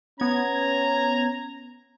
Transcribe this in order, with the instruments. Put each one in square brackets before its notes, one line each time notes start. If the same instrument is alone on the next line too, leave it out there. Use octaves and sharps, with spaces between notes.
[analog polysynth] B3 G#6 [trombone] C#4 [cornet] A#5